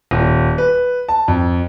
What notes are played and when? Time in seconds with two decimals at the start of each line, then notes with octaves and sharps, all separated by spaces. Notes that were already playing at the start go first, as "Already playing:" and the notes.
0.11 D#1
0.58 B4
1.08 A5
1.28 F2